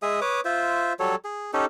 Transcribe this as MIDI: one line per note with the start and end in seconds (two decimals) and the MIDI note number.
0.02 0.20 56
0.02 0.20 68
0.02 0.20 76
0.02 0.20 87
0.21 0.41 71
0.21 0.41 73
0.21 0.41 86
0.21 0.41 87
0.45 0.93 65
0.45 0.93 72
0.45 0.93 76
0.99 1.15 54
0.99 1.15 55
0.99 1.15 69
0.99 1.15 73
1.24 1.51 68
1.53 1.65 61
1.53 1.65 63
1.53 1.65 67
1.53 1.65 69